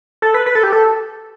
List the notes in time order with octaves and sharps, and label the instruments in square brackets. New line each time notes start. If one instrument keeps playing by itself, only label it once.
[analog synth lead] A4
B4
B4
A4
G4
A4